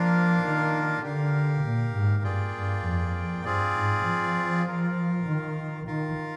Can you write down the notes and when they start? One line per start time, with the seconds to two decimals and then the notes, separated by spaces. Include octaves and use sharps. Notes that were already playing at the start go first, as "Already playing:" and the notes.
Already playing: F3 A#3 D4 F4 A#4 F5
0.42 D#3
1.03 D3 G4 A#4 F5
1.64 A#2
1.93 G#2
2.23 G2 A#3 F4 G#4 D5 G5
2.54 G2
2.84 F2
3.44 G2 C4 F4 G#4 D5
3.75 G#2
4.05 F3
4.66 F4 A#4 F5
5.26 D#3
5.87 D#3 F4 A#4 F5